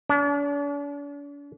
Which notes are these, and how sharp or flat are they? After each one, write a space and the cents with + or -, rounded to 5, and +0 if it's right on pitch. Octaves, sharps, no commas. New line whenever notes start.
D4 -45